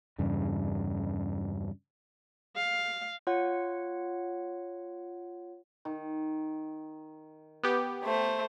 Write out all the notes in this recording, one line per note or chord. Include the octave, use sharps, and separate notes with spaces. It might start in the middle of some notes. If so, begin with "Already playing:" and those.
E2 G2 C#3
F5
F4 C#5 F#5
D#3
B3 G4
A3 C5